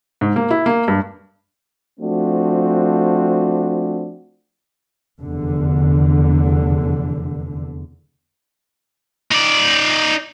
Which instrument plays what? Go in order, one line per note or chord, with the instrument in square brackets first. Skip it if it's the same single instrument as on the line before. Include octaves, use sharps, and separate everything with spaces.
[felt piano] G#2
A#3
E4
A#3
G2
[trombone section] F3 A3 C4 D4 F#4
[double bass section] F1 E2 D3
[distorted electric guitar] D#4 D5